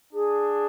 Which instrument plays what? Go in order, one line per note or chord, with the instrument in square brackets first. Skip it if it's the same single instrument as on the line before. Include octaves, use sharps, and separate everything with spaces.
[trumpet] D4 [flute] G#4